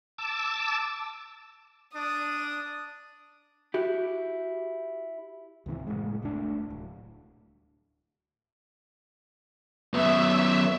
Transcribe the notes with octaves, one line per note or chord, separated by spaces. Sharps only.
A5 D6 E6
D4 D#6
E4 F#4 G4
C#2 G#2 C3 E3
F#1 C2 A2 G#3
E1 C2 A3 D4
D1
F#2 B3 E5